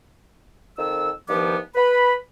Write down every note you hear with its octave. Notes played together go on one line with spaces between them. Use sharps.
F2 D#3 E6
G2 D#3 F3 B3 D6
B4 B5